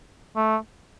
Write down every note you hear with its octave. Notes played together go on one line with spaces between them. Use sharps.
A3